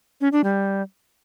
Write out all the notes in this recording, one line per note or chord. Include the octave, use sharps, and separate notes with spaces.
C#4
D4
G3